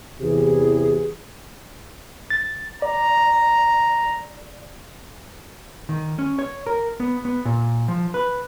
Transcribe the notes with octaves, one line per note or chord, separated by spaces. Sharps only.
E2 C3 E3 G4 G#4
A6
D5 A#5
D#3
C#4
C#5
A#4
B3
B3
A#2
F3
B4